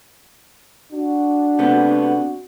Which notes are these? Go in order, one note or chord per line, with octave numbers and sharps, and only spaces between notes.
D4 F#4
C3 A3 B3